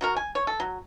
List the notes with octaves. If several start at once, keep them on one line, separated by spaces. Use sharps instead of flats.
F#3 F#4 A#4
G#5
C#5
A4
F#3